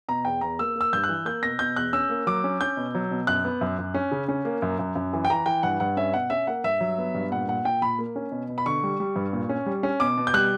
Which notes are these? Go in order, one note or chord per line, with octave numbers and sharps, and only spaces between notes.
B2 A#5
E2 G5
E2 A#5
A#3 E6
A#3 E6
G2 G6
F#6
E3
A#3 G6
B2 A#6
B2 G6
E2 F#6
C#4 E6
A#3
F#3 D6
C#4
C#4 G6
B2
F#3
B2
F#2 F#6
B3
F#2
F#2
C#4
C#3
C#4
A#3
F#2
F#2
F#2
E3
G5
E3 A#5
E3 G5
G2 F#5
G2 F#5
C#4 E5
B2 F#5
C#4 E5
A#3 F#5
G2 E5
F#3
B3
G2
A#2 F#5
A#2 F#5
A#2 G5
A#2 B5
A#3
C#4
B2
B2
B5
D3 C#6
G3
G3
G2
A#2
C#4
G3
C#4
B2 D6
B2
G6
G3 F#6